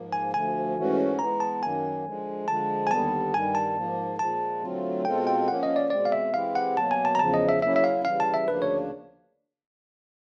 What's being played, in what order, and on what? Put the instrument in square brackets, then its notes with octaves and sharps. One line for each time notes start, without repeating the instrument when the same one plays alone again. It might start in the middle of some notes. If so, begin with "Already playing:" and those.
Already playing: [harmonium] G#2 F3 A#3
[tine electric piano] G#5
[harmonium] D2 D3 F3 A3 [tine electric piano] G#5
[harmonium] G#2 E3 A3 C#4 F#4
[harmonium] E3 G#3 B3 [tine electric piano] A#5
[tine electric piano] A5
[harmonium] F#2 D#3 F#3 A#3 [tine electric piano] G#5
[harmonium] D3 F3 G#3
[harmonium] D3 F3 G#3 [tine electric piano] A5
[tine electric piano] G#5
[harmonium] D#2 D3 G3 B3 [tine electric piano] A5
[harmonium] G2 D#3 G3 [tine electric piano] G#5
[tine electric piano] A5
[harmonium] G#2 F3 A#3
[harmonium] A#2 F3 G#3 [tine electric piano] A5
[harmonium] D3 F#3 A3 C4 F4
[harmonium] B2 G#3 C4 F4 A4 [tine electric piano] G5
[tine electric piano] G5
[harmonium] F3 A#3 C#4 [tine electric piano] F#5
[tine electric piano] D#5
D5
[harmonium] B2 G#3 C4 [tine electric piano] D5
[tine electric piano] F5
E5
[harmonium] E3 G#3 C4 E4 G4 [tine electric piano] F5
[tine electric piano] F#5
[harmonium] B2 F#3 A#3 [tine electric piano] A5
[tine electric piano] G#5
A5
A#5
[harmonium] E2 C#3 F3 [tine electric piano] A5
[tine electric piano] D#5
E5
[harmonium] C#3 F#3 A#3 C#4 E4 [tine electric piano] E5
[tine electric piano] E5
F5
[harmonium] C#3 E3 G3 [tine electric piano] F5
[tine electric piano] A5
E5
[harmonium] D2 C#3 F3 A#3 D4 [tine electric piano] B4
[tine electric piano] C#5